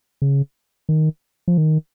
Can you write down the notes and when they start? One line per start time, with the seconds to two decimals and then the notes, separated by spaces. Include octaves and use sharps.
0.22 C#3
0.89 D#3
1.48 F3
1.58 D#3